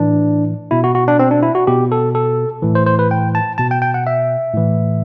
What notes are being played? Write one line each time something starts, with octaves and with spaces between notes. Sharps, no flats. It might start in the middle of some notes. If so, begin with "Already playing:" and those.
Already playing: A2 E3 D4
B2 E4
F#4
F#4
D4
C4
D4
E4
F#4
B2 G4
A4
A4
A2 E3
C5
C5
B4
G5
A5
B2 A5
G5
G5
F#5
E5
A2 E3